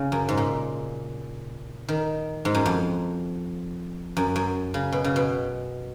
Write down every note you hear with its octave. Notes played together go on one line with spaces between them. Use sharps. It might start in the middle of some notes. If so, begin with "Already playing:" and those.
Already playing: C#3
F#2
G#2
A#2
D#3
G#2
F#2
F2
F#2
F#2
C#3
B2
C#3
B2